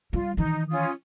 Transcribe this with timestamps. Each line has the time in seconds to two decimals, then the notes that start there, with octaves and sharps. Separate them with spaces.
0.13 G3 F4
0.37 D#3 E3 D#4
0.70 C#4 F4 D#6